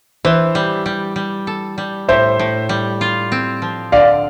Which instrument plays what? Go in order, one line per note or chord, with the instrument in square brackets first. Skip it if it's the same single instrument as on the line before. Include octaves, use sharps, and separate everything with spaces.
[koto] E3 [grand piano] C5 E5
[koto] G3
G3
G3
A4
G3
[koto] A2 [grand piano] C5 E5
[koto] A2
G3
F4
C4
F3
[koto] D3 [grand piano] D5 F5